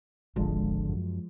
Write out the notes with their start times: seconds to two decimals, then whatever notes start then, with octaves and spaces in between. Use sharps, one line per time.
0.36 D#1 G#1 D3 F3 G#3
0.89 F#2